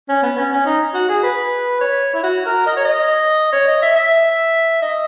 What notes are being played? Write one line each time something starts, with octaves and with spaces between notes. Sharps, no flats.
C#4
B3
C#4
C#4
D#4
F#4
G#4
B4
C#5
E4
F#4
A#4
D#5
C#5
D#5
C#5
D#5
E5
E5
D#5